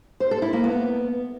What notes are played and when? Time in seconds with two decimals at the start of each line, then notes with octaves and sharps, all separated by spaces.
0.20 C5
0.31 A4
0.42 E4
0.53 A#3
0.64 B3